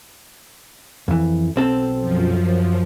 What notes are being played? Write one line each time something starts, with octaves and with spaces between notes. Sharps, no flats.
F2 E3
B1 C4 A4
F#2 F3